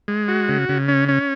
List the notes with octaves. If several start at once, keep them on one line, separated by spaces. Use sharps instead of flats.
G#3
F#4
C#3
C#3
C#4
C#4